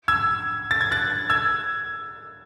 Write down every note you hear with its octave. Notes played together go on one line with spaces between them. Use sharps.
E6 G#6
A6
G#6
F#6 A6
E6 G#6